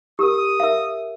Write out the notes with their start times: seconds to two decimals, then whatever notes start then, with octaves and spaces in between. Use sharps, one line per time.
0.19 G4 A#4 D#6
0.60 A#4 E5 F5